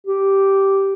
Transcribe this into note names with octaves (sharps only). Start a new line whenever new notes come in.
G4